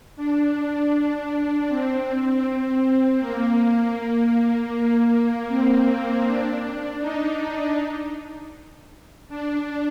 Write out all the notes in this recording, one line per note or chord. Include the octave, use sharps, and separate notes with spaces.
D4
C4
A#3
A#3
C4
D4
D#4
D4